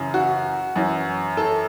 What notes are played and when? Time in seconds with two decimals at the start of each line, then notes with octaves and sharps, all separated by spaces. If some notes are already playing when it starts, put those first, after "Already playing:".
Already playing: F#2 C#3 E3
0.14 F#4
0.76 F#2 E3
1.37 A4